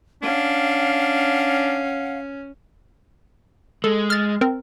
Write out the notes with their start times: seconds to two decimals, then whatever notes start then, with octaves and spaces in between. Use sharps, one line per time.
0.22 C#4 D4 F5 F#5
3.84 G#3 A4
4.10 F6 A6
4.41 C4 A#4